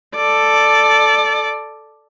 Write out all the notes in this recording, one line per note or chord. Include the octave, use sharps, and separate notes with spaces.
A4 D5